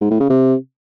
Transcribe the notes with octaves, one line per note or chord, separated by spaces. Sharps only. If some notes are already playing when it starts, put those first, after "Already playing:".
G#2
A2
C#3
C3